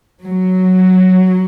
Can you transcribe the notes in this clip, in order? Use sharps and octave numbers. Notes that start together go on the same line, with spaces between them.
F#3